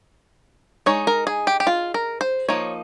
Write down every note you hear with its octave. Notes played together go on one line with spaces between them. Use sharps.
G#3 D#4 C#5
A#4
G#4
G4
G4
F4
A#4
C5
F3 A#3 D#4 C#5